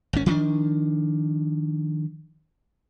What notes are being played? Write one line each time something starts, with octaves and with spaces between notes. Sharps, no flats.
G#1 C#4
D#3 F3 C4 D4